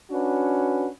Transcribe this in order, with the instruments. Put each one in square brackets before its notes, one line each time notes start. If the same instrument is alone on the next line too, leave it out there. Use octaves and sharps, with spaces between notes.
[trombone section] C#4 D4 F#4 B4